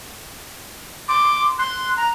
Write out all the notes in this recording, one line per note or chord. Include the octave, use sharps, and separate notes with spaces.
C6 D6
C6 F#6
A#5